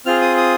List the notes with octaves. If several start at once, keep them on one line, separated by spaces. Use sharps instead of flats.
C4 F4 G#4 F6
D#6
D#6